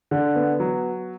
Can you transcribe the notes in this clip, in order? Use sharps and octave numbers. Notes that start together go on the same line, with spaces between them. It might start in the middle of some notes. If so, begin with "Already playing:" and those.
D3
B3
F#3